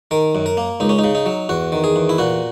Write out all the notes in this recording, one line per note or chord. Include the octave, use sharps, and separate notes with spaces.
D#3 A#4
F#2
A#4
A#3
C#2 D#4
C#4
D#4
C#3
D#4
F#3
E2 F#4
D#3
G#4
E2
E4
A#2 F#4